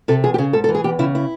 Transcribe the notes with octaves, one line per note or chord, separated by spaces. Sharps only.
C3 A4
E2 G#4
G4
C#3 G#4
G#2 A4
A4
E3
G#4
E2 G4
C#3 E4
E4